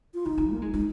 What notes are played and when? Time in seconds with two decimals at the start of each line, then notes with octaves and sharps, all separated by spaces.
0.14 F4
0.25 D#3 D#4
0.38 D#3
0.50 A#3
0.62 G#3
0.74 G#3 D#4